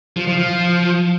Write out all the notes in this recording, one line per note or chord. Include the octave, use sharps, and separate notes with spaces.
F3
F3
F3